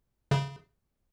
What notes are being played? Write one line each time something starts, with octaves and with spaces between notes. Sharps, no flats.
C#3